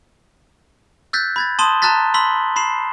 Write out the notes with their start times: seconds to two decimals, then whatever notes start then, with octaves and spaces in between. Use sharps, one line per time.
1.13 E6 F#6 G6 A6 B6
1.36 B5 G#6 A6
1.59 A5 C6 D#6 D#7 E7 G7
1.82 A5 A#5 F6 F#6 A6 B6
2.14 B5 C6 E6 B6 F#7 G7
2.56 B5 C6 C7 E7